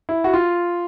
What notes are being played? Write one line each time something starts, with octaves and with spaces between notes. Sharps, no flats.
E4
F#4
F4